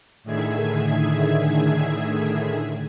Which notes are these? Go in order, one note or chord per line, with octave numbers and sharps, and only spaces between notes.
A2 D3 D#3 G#4 E5 G#6